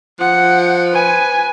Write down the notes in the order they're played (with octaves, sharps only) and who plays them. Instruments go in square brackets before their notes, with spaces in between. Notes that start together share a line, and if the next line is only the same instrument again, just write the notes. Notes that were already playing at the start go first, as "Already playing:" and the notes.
[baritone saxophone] F3 [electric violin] F#5
[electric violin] B4 G#5